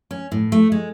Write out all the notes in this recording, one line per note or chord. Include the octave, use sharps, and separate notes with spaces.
C#4
A2
A3
G#3